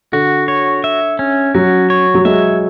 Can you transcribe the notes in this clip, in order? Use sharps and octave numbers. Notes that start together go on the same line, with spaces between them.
D3 F#4
C#5
E5
C#4
F#3 F#4
C#5
F#3
G#3 E5